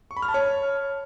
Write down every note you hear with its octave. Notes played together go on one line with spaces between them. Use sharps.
C#6
B5
F6
A5
C#5